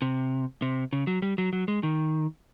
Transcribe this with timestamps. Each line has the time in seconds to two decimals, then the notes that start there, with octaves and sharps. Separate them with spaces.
0.02 C3
0.62 C3
0.93 C#3
1.07 F#3
1.22 G3
1.38 F#3
1.53 F#3
1.68 G#3
1.83 D#3